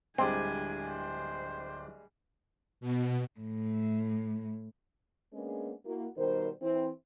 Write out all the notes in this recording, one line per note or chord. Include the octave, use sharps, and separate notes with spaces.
D1 G3 G#3 C4 D4 G5 G#5
C5
B2
A2
G#3 A#3 B3 C#4 D4 G#4
A#3 E4 F#4
B2 D#3 G3 A#4 C5
E3 C4 E4